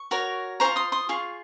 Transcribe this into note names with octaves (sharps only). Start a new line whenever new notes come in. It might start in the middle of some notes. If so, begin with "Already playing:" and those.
Already playing: C#6
F#4 A#4 C#5
F4 G#4 C5 A#5 C#6
C6 D#6
C6 D#6
F4 G#4 C#6